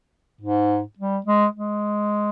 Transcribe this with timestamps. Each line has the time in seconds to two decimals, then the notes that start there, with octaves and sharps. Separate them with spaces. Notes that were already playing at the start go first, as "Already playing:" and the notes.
0.41 G#2
0.98 G3
1.26 G#3
1.55 G#3